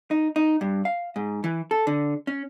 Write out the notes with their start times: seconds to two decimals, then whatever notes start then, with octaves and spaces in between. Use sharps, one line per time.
0.11 D#4
0.36 D#4
0.61 G2
0.85 F5
1.16 G#2
1.44 E3
1.71 A4
1.87 D3
2.27 C#4